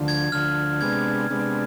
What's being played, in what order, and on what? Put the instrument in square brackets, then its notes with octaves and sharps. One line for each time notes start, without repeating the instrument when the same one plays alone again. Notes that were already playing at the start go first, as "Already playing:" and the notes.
Already playing: [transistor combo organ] D2 D3 F3
[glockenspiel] G#6
[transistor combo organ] D2 D3 F3 [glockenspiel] F6
[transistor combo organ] C3 G#3 B3 D4 [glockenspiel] G#6
[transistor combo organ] C3 G#3 B3 D4